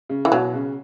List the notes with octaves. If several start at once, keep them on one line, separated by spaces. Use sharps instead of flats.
C#3
E3
B2 F#3
C#3